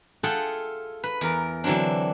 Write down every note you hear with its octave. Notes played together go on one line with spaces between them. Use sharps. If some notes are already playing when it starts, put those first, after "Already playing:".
F4 G#4 A4 E5 F#5 G5
B4
E2 A#4
D3 E3 F#3 C4 D4